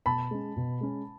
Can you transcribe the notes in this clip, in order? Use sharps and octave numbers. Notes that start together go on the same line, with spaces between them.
B2 A5 B5
G#3 C#4
B2
G#3 C#4